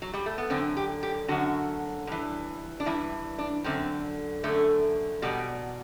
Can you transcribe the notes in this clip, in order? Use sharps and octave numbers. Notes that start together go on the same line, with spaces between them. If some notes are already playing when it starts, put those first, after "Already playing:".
F#3
G3
A3
B3
F#2 D3 C4
G4
G4
F#2 D3 F#4
G2 E3
D4
G2 E3 E4
D4
F#2 D3 C4
F#2 D3 A3
E2 B2 G3